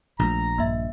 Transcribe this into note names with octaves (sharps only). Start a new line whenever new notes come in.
A#1 A3 A#5
G2 A#3 E5